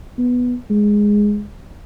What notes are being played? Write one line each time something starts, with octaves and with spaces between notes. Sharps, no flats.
B3
G#3